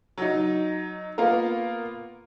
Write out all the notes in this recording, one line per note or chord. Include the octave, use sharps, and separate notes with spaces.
F#3 D#4
A#3 B3 F4 A#4